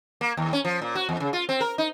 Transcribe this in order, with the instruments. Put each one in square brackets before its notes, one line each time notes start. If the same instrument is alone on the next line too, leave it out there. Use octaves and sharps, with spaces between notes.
[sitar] A#3
D#2
C#4
F3
A#2
F#4
E2
C#3
F4
C4
A#4
D#4